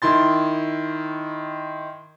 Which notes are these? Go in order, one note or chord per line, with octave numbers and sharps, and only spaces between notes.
D#3 E4 C6 A6